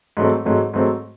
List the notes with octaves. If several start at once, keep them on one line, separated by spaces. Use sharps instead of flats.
G#2 F#3 A3 C4
G#2 F#3 A3 C4
G#2 F#3 A3 C4